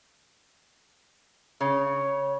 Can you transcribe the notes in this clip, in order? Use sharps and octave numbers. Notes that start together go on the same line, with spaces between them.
C#3 C#5